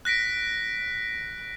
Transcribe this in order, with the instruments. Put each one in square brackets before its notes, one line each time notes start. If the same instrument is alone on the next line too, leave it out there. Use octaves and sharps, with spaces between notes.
[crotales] F#6 A#6 B6 D7